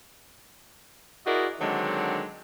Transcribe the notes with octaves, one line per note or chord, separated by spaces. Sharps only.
E4 F#4 G#4 A#4 D5 D#5
D3 D#3 F#3 G#3 C4 D4